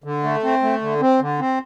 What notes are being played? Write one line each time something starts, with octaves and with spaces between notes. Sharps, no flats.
D3
A3
C4
A3
D3
C4
D3
C4